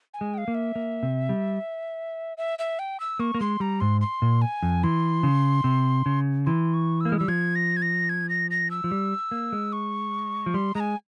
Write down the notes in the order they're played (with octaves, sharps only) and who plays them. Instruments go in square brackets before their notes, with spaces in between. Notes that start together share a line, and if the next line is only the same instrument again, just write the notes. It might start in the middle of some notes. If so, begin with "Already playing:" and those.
[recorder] G#5
[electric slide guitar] G#3
[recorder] G5
F5
[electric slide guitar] A#3
[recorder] E5
[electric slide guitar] A#3
C3
G3
[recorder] E5
E5
G5
E6
[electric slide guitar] A#3 [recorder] C#6
[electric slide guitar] A#3
[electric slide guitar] G#3 [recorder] C6
[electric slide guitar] G3 [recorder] A#5
[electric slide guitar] G#2 [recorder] C6
[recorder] C6
[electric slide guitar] A#2
[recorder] G#5
[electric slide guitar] F2
[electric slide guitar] E3 [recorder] C6
[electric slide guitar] C#3
C3
C#3
[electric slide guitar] E3 [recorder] C6
[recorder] C#6
E6
[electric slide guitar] A#3
[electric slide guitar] G#3 [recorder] F6
[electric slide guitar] G3 [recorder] E6
[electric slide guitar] F3 [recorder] G#6
[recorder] A#6
G#6
A#6
G#6
A#6
A#6
E6
[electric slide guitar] F3
G3
A#3
G#3
[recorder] C#6
[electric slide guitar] F3
[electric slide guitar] G3 [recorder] C6
[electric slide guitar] G#3 [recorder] A#5
[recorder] G#5